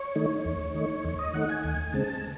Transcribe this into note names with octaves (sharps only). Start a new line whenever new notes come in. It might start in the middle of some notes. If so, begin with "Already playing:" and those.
Already playing: C#5
D#3 A3 D#4
E2
D#3 A3 D#4
E2 C#5
D#5
D#3 A3 D#4 F#5
G#5
D#2 G#5
C#3 G#3 C4 A5